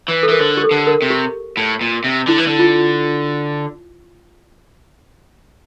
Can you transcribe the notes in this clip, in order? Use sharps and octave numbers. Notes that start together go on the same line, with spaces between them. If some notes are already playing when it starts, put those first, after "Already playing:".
E3
A4
E3 A#4
D3 C5
G4
A4
D3
A#4
C3
G4
A2
A#2
C3
D3 E4
E3
D3
F4